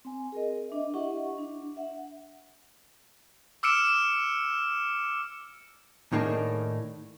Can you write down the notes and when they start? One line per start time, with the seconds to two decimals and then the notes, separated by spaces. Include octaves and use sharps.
0.05 C4 G#5
0.32 G#4 A#4 D#5
0.69 D4 D#5 E5
0.94 E4 G4 D#5 E5 F#5 C#6
1.38 D4
1.77 E5 F#5
3.63 D6 E6 F6 C#7 D7 E7
6.12 A2 D#3 A#3 D4 G#4